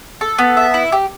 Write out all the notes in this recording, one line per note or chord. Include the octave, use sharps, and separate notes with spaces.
A4
B3
E5
E4
G4